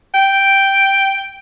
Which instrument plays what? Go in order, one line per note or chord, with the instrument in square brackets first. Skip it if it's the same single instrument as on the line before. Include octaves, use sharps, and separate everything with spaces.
[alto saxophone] G5